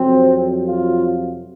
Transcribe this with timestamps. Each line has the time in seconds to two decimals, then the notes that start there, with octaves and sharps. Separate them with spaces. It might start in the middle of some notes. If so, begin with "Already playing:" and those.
Already playing: F2 C3 F#3 C4
0.66 F4